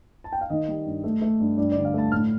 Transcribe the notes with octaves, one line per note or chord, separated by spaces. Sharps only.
A5
G5
F5
D#3 D#5
G3
G2
A3
A3
G2
G2 D5
D5
D3
F5
A3 A5
A2 F6